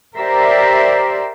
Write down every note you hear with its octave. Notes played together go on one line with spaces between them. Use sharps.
G4 A#4 C5 D5 E5